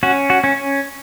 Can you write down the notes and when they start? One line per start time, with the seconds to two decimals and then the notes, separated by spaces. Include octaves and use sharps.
0.03 C#4 F#4
0.30 F#4
0.44 C#4